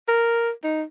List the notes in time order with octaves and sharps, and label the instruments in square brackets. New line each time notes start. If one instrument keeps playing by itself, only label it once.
[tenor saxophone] A#4
D#4